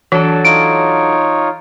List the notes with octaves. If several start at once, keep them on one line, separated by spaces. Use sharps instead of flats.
E3 F#3 D4 A4
D#4 F4 C#5 D7